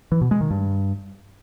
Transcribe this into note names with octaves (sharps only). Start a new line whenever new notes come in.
E3
B2
G#3
D#3
G2